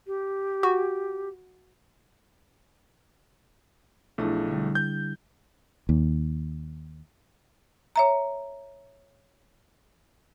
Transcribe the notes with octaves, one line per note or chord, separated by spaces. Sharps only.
G4
F#4
B1 F3 A3 D4 E4 G#4
D3 G3
G6
D#2
C#5 E5 A#5